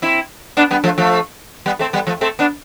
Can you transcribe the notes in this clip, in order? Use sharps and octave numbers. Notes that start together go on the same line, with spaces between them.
C4 E4
B3 D4
G3 B3
F3 A3
F3 A3
G3 B3
A3 C4
G3 B3
F3 A3
A3 C4
B3 D4